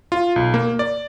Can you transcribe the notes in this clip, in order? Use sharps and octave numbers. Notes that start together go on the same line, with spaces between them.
F4
B1
A#3
D5